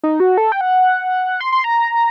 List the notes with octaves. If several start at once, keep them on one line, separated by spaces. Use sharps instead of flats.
D#4
F#4
A4
G5
F#5
C6
C6
A#5